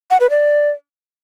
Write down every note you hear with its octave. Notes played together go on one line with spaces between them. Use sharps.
F#5
B4
D5